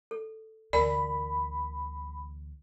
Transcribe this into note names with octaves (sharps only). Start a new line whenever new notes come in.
A4
D2 E3 A#4 D5 G#5 B5